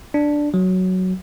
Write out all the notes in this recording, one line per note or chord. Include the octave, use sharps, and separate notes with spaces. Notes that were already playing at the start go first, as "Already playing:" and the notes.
D4
F#3